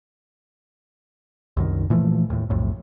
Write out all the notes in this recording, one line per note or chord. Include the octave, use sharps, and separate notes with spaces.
C2 F#2 D#3
A#2 E3 F3 A3
D#2 A2
B1 F2 A2